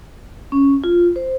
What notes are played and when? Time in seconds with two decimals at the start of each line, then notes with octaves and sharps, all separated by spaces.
0.52 C#4
0.84 F4
1.16 C5